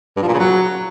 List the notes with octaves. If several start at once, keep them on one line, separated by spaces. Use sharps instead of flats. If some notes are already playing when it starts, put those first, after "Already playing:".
G2
F3
A#2
C#3
F#3